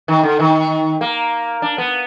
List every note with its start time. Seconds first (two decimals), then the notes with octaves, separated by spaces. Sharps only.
0.08 D#3
0.23 D3
0.40 D#3
1.01 A#3
1.62 D4
1.78 B3